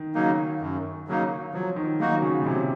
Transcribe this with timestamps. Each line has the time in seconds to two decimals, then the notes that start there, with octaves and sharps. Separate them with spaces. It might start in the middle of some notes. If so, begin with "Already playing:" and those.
Already playing: D#3
0.15 C#3 F#3 A#3 D#4
0.61 F#2
1.08 C#3 F#3 A#3 D#4
1.53 F3 F#3
1.76 D#3
2.00 F#3 A#3 D#4 F#4
2.22 C#3
2.42 A#2
2.46 C3 F#3